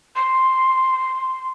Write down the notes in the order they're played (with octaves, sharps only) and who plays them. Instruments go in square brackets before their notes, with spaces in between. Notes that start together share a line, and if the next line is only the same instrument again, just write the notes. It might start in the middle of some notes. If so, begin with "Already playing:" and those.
[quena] C6